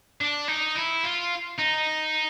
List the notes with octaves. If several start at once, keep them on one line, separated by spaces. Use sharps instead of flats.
D4
D#4
E4
F4
D#4